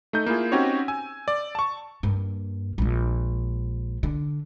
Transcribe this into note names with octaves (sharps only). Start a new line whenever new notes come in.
A3 D#4 G6
A#3 E4 F4 G#4
C4 C#4 D#4 F#4 G4 C#5
G#5 E6
D5
A5 C#6
G2 A#3
A#1 G#3
D3